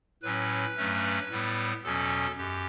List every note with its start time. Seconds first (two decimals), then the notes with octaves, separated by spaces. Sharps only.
0.22 A2 F#3 C#4 B4
0.76 G2 F#3 A3 C#4
1.30 A2 G3 B3
1.84 E2 B2 F#3 C#4 A4
2.37 F#2 G4